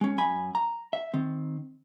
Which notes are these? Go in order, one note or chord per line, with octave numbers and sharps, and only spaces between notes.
G#3 C#4
F#2 G#5 B5
A#5
E5
D#3 C4